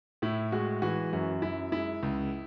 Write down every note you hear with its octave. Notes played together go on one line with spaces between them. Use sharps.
A2 E4
G#3 F#4
E3 F#4
F#2 F#4
F#2 E4
G#3 E4
C#2